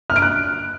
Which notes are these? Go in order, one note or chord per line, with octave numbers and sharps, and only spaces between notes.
F6
D7
F#6